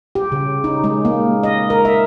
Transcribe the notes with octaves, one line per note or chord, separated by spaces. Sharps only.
G4
C#3
D#4
G#3
A#3
D#5
A#4
E5